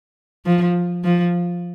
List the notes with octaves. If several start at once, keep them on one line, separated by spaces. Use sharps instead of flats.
F3
F3